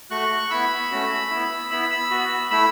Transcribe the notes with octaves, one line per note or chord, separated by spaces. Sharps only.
A3 F#4 C#6 F#6
B3 E4 B5 E6
A3 C#4 F#4
B3 E4
B3 E4 B5 E6
B5 E6
B3 F#4
A3 E4 B5 E6